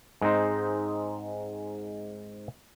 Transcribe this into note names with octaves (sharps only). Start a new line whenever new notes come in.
G#2 G#3 C4 D#4 C5